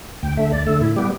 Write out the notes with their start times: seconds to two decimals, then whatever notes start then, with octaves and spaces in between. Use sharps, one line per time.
0.23 D2 G5
0.37 D3 A3 E5
0.52 D2 D5
0.66 D3 A3 A4
0.81 A2 E4
0.96 G3 B3 G4